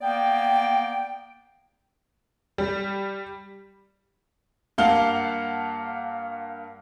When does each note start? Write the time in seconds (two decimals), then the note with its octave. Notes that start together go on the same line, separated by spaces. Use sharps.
0.01 A#3 B3 D5 G5
2.58 G3
4.78 G2 A#3 F5 F#5 A5 G7